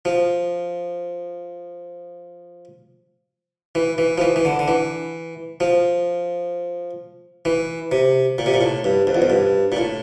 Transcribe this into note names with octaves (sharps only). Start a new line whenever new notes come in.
F3
E3
E3
F3
E3
E3
D3
D3
E3
F3
E3
C3
A#2
C3
A#2
A2
G2
F2
E2
F2
G2
A#2
A2